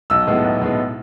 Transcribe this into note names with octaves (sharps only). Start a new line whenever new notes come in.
B1 E6
A2 G#3 B3
B1
A2 G#3 B3